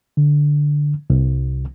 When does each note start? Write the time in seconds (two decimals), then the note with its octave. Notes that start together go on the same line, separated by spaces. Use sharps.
0.17 D3
1.10 C2